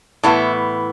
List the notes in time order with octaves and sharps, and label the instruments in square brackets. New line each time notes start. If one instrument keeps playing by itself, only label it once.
[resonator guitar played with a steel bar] A2 E3 B3 E4